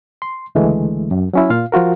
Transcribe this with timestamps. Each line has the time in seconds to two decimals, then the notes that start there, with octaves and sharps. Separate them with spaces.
0.22 C6
0.55 C#2 D3 E3 G#3 A3
1.11 F#2
1.33 F#3 C#4 E4
1.50 A#2 F4 F5
1.72 F3 F4 F#4 A#4